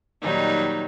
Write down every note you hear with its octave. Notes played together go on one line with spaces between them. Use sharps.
A#2 D#3 F#3 G3 D#4